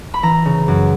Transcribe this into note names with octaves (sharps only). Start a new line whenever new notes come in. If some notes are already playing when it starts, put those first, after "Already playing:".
B5
E3 A#5
C#3
F#2